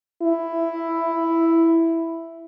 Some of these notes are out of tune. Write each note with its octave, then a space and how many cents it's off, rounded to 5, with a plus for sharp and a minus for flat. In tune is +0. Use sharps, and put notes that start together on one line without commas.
E4 +5